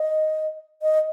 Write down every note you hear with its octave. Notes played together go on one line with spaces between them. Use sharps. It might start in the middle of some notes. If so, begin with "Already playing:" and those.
Already playing: D#5
D#5